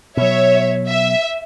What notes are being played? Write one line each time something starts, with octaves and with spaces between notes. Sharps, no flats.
B2 F#3 C#5 E5
E5